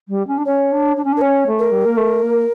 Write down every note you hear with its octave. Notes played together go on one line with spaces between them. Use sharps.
G3
C#4
D4
C#4 C#5
D4
D4
C#4
D4
A#4
C#4 C#5
A3
A#4
G3
A#3
A3
A#3